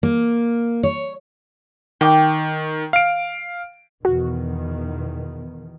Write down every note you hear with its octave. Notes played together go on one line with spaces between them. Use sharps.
A#3
C#5
D#3 G5 D6
F5 D7
E2 B2 D#3 F#4